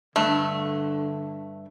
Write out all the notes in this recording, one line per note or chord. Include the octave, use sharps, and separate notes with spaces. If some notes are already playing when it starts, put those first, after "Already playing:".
G2 D3 A3